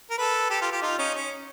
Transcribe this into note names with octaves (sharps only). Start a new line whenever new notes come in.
A#4
A4 B4
G4 A4
F4 G4
F4 G4
D#4 F4
C#4 D#4
C#4